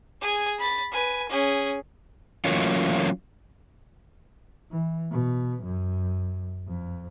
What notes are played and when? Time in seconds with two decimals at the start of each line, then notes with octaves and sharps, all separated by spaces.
0.22 G#4 G#5
0.60 B5 A6
0.92 B4 G#5
1.29 C#4 G#4
2.45 E3 F#3 A3 A#3 C#4 F4
4.72 E3
5.11 B2
5.64 F#2
6.68 F2